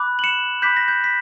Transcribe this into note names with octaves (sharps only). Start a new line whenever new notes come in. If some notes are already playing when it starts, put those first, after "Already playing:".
Already playing: B5 D6 F#6
F#7
C#7 E7
B5 D6 F#6 G6 B6
A#6
G6
B6